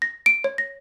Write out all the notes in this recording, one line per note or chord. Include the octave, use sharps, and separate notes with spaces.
A#6
D7
C#5
A#6